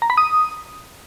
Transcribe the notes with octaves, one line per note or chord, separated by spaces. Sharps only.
A#5
B5
D#6